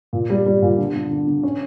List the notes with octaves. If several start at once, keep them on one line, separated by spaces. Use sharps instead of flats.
A#2
G3
G3
A#2
D3
D3
D3
D3
C#4